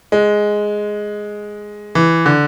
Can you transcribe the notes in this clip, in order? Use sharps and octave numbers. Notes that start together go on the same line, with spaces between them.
G#3
E3
D3